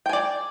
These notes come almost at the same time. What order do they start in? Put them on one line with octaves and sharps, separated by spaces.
G5 G#5 D5